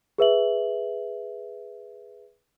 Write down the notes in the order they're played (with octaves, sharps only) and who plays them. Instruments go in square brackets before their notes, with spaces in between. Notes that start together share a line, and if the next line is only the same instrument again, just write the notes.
[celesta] G#4 B4 E5 F#7